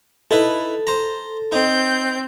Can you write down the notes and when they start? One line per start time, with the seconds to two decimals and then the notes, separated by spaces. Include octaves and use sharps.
0.31 D#4 E4 A4 B4
0.87 C5 A#5
1.52 C4 D#4 G6